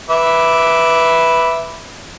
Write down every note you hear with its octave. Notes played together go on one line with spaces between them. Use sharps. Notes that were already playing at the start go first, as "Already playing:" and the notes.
B4 E5 D6